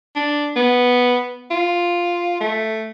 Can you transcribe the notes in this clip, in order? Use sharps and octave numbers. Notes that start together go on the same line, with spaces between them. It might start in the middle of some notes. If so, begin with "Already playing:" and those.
D4
B3
F4
A3